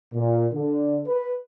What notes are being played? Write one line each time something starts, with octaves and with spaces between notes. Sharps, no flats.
A#2
D3
B4